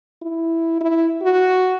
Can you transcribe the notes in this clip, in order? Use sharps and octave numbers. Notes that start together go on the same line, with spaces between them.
E4
E4
F#4